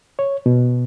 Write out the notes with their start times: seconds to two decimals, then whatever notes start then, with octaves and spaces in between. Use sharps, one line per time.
0.19 C#5
0.46 B2